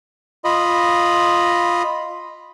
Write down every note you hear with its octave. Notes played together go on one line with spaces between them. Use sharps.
F4 D#5 B5